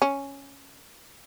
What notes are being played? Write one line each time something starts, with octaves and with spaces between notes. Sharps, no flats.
C#4